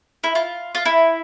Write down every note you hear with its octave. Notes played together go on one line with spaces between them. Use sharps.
E4
F4
F4
E4